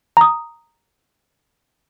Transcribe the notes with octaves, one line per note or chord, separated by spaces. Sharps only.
A#5 D#6